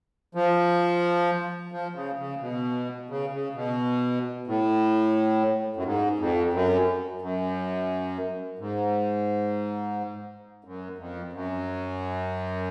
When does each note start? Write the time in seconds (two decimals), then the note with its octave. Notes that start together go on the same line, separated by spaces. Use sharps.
0.35 F3
1.72 F3
1.95 C#3
2.19 C#3
2.40 B2
3.10 C#3
3.32 C#3
3.55 B2
4.47 A2
5.76 F#2
5.85 G#2
6.19 F2
6.53 F#2
7.22 F#2
8.59 G#2
10.65 F#2
10.98 F2
11.33 F#2